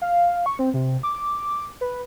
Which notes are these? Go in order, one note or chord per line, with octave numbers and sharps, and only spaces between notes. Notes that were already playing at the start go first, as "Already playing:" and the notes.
F5
C#6
C4
C3
D6
B4